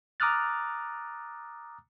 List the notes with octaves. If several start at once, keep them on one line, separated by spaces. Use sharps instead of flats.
A#5 D6 D#6 F6 F#6 A6